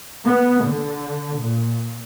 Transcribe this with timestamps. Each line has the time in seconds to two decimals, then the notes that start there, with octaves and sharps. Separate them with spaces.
0.24 B3
0.64 D3
1.37 A#2